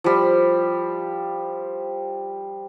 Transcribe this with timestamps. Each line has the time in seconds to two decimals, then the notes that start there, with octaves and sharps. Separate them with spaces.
0.04 F3 G3